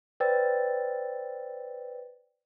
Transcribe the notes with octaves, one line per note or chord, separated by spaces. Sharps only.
B4 C5 D5 G5 E6 A6